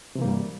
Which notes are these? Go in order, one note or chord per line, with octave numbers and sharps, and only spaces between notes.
G2 C3 E3 G3 A#3